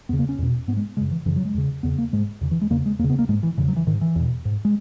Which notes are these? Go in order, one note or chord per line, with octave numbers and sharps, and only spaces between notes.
E2 C#3 B3
A#3
C#4
E2 B2
G#2 B3
G#3
F#2 C#3 G#3
E3
F#2 C#3 E3
F#3
G#3
E2 C#3
E2 C#3 B3
A#3
G#2 G#3
E2 C#3
E3
G#3
E2 C#3 A#3
G#3
E2 C#3 A#3
B3
A#3
G#2 G#3
E3
E2 C#3 E3
F#3
E3
G#2 D#3
E3
E2 B2
G#2
G#3